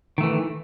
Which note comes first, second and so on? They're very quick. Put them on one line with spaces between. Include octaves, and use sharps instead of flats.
D#3 A3 E3